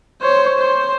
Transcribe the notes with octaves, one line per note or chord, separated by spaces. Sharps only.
C5 C#5
C5